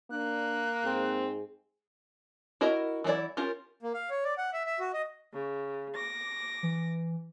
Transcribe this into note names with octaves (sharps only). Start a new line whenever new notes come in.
A#3 D4 F#6
G#2 C4 D#4 G#4
E4 F#4 A#4 D#5
E3 F#3 A3 E4 D5
C#4 F4 G4 A#4
A#3
F5
C#5
D5
F#5
E5
E5
F#4
D#5
C#3
D6 A#6
E3